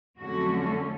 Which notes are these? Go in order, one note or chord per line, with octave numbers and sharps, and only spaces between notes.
F2 D3 F#3 A3 C#4 F#4